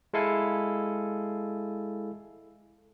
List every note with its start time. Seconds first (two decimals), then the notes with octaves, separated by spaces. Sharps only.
0.13 G#3 E4 A4 F5 G#5